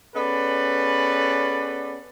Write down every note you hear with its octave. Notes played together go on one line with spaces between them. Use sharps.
B3 C#4 G#4 A4 B4 D5